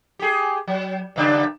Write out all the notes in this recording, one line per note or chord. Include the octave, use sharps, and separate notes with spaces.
G4 G#4
F#3
G2 C#3 D4